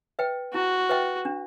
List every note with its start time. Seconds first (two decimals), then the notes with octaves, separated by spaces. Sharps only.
0.19 B4 E5 G5
0.54 E4 F#4
0.89 B4 E5 G5
1.25 D4